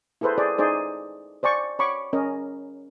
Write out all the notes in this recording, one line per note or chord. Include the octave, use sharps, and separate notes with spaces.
E4 G#4 A4 B4 C5
G#4 C5 D5
D#4 G#4 C5 D5
C5 D5 G#5 C#6
C#5 B5 C#6 D6
C#4 A#4 D#5